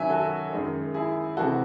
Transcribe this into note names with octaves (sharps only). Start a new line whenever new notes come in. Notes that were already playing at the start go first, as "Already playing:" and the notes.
Already playing: F#2 D#3 F#3 E5 G#5
F#4 A4
F#2 D#3 G#3
E4 G#4
C3 E3 G#3 F#4 A4